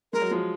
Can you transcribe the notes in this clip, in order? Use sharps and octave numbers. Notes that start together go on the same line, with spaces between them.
G#3 A#4
F#3
F3 G#3